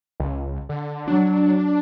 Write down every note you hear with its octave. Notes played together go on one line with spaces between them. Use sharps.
C#2
D3
F#3 D4